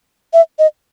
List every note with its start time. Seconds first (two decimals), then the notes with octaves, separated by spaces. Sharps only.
0.33 E5
0.59 D#5